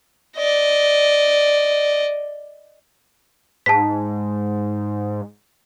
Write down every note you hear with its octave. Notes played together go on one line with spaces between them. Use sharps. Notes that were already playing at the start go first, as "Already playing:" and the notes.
D5 D#5
G#2 A5 B6